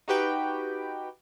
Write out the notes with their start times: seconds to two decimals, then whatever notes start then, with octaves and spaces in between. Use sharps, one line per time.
0.08 D#4 F#4 G4 B4 G5